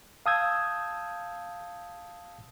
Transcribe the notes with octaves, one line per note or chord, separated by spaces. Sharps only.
F5 A5 D#6 E6 G6 G#6